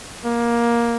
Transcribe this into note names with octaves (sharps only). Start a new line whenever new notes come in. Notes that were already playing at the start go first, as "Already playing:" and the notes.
A#3